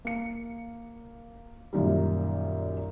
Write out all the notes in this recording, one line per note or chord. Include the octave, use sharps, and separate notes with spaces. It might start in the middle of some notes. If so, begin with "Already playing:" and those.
A#3 C#7
F#2 A#2 D#3 G3